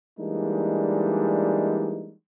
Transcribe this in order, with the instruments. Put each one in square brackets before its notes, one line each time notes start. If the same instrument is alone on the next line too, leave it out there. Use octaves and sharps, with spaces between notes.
[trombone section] E3 G3 G#3 A#3 D4 D#4